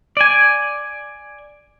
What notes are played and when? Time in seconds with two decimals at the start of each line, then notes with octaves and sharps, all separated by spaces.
0.17 D5 G#5